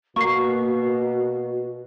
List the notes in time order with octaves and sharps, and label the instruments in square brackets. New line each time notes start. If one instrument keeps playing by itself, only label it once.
[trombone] B2 [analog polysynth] A#3 [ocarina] F#4 [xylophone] C#6 C7